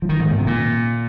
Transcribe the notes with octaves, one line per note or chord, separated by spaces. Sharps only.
F3
D#3
G#2
A#2
C3
A#2